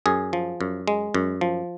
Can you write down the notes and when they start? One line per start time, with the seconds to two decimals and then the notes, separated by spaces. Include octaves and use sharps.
0.06 F#2 G#4
0.33 F3
0.61 F#2
0.88 G#3
1.14 F#2
1.41 F3